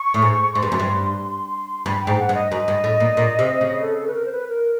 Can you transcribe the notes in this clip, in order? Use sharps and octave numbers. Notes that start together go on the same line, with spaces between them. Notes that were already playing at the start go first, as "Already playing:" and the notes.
Already playing: C#6
A2
G#2
G#2 C6
G2
F#2
G2
G2 B5
G5
G#2
F#5
G2
D#5
F#2 D#5
G2
A2
A#2
A#2
C3
C#3
A4
A4
B4
A#4
C5
B4
A#4